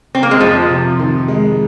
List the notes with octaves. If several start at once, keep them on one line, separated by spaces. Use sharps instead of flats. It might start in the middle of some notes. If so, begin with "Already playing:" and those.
C4
A#3
G#3
F2 F3
C3
D#3
G#3